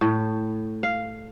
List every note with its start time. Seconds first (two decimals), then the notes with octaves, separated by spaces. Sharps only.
0.01 A2
0.83 F5